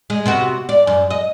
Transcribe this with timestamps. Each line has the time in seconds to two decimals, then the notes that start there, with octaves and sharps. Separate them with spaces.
0.10 G#3
0.26 C3 B3 F#4
0.69 D5
0.87 F#2
1.10 D#5